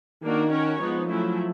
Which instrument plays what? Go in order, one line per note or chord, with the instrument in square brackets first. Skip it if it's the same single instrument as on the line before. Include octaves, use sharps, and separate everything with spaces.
[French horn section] D#3 [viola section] A#3 D4 F#4 A#4
[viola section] C#4 F#4 A#4 C#5
[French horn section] F3 [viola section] G#3 B3 D#4
[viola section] F#3 A3 C#4 E4